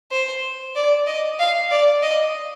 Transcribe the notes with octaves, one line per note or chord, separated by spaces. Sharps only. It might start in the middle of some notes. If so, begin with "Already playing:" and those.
C5
D5
D#5
F5
D5
D#5